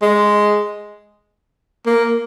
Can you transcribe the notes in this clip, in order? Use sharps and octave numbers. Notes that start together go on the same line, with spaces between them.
G#3
A#3